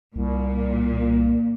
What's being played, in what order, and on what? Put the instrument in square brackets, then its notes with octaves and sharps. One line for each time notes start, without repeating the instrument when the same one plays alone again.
[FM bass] C2 [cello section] A#2